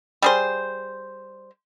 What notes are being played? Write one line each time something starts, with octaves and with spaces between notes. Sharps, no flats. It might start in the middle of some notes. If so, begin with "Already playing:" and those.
G3 G#4 C5